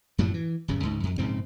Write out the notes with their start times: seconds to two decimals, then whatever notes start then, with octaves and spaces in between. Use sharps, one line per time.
0.18 F#2 A2 F3 F#3
0.34 E3
0.68 D#1 F#2 C#3
0.83 C#2 G#2
1.03 F2
1.18 A#1 G#2 C#3 C4